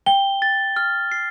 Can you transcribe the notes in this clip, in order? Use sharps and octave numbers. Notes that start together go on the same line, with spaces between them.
G5 G7
A6
F6
C7